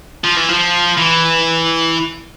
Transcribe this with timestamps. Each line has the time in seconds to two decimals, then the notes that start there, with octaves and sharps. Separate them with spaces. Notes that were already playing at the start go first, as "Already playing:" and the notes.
0.24 F3
0.37 E3
0.49 F3
0.97 E3